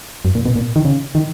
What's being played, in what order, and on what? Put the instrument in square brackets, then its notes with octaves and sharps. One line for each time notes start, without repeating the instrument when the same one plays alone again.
[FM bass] F#2
A#2
B2
A#2
D#3
C#3
D#3